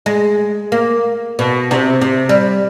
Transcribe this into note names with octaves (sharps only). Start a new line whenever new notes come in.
G#3
A#3
B2
C3
C3
G3